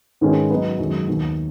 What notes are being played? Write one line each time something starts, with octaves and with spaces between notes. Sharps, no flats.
G#2 D#3 G#3 C#4 B4
F#3 B3 D#4 B4 D#5
F#2 D#3 G#3
D#2 D#3 B3